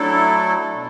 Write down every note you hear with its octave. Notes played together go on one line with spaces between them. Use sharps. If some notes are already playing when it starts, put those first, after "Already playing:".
Already playing: F#3 A3 D4 E4 A4
B2